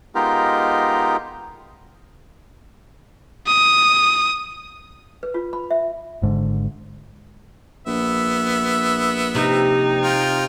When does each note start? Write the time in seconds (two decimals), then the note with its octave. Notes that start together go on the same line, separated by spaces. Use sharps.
0.15 G#3 B3 D#4 F4 G4 A#4
3.47 D#6
5.23 B4
5.34 F4
5.53 B5
5.71 E5
6.22 G#1 G#2 D3
7.87 A#1 B3 E5
9.35 C3 D#4
10.03 F4 G5